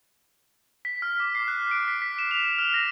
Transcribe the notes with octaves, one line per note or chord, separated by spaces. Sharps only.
B6
F6
D6
C7
F#6
D7
B6
B6
E7
F7
F6
A#6